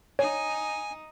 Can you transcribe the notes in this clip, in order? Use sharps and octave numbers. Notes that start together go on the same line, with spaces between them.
D#4 C#5 G#5